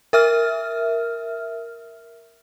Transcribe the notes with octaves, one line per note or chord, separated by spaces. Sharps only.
A#4 E5 F6